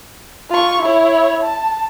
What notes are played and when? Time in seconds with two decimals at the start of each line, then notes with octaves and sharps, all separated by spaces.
0.50 F4 C#6
0.82 E4 C#5
1.43 A5